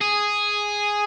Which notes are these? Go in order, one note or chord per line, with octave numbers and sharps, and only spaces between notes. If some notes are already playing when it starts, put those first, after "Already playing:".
G#4